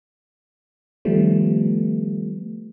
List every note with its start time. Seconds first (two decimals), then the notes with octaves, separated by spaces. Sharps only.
1.05 D#3 F3 G3 A3 B3